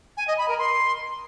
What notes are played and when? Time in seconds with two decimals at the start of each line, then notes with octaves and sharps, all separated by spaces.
0.17 G#5
0.27 D#5
0.38 B5
0.48 A#4
0.59 C6